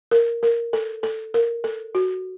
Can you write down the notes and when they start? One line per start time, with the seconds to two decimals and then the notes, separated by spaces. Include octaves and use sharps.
0.11 A#4
0.43 A#4
0.73 A4
1.03 A4
1.34 A#4
1.64 A4
1.95 F#4